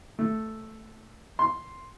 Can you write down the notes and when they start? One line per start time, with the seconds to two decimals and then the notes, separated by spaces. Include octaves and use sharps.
0.19 A3
1.39 C6